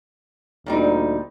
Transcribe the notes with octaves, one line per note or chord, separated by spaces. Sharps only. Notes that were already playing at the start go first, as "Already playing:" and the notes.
D2 A#2 G3 D#4